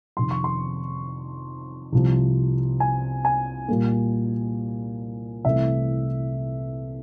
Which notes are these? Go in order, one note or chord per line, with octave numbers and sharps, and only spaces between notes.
F2 C3 D#3 C6
C#6
C6
C2 C3 F3
G#5
G#5
A#2 G3 A#3
C2 C3 E3 A3 C4 E5